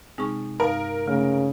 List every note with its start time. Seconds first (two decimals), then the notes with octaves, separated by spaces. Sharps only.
0.18 C3 G#3 C4 D#4 G#4 C#6
0.60 G2 D#4 A#4 F5
1.08 C#3 A3